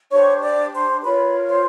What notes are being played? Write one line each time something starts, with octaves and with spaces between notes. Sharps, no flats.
D4 G4 C5 C#5 C#6
D5 D6
C5 C6
F4 A#4 B4 C#5 B5
C5 C6